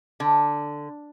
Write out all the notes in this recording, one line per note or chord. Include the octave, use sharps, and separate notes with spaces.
D3